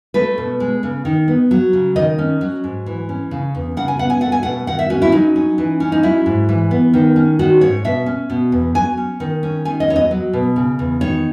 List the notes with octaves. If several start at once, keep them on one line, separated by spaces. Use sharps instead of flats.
A3 B4
B2
G#3
C#3
D#3
B3
F#3
C#3
D#3 D#5
C#4
F#3
G#2
E3
C#4
C#3
E2
C#3 F#5
G#5
B3 F#5
G#5
A3 F#5
G#5
B2 F#5
D#3 F#5
E5
C#4 F#4
E4
F#3 D#4
C#4
E3
C#4
D#4
F#3 E4
G#2
E3
B3
D#3
C#4
D#3 F#4
G#2 C#5
B2 E5
C#4
B2
E2
F#3 G#5
C#4
D#3
C#4
D#3 G#5
D#5
E2 C#5
D#5
F#3
B2
C#3
E2
D#3 C#5